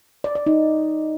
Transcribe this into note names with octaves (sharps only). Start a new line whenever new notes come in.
D5
D5
D#4